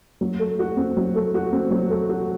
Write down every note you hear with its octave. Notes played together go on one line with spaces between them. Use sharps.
F#3
A3
F#4
C4
F#3
A3
F#4
C4
F#3
A3
F#4